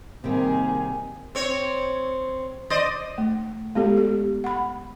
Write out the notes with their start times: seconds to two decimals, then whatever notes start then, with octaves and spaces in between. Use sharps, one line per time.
0.24 C3 D#3 G3 A#3 C4 D#4 G#4
1.35 C4 C#5
2.70 C5 D5 D#5
3.18 A3
3.75 G#3 B3 G4 A4
3.97 G4
4.44 F#5 B5